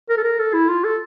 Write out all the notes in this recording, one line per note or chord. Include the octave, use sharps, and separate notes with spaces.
A#4
A4
A#4
A4
E4
F4
A4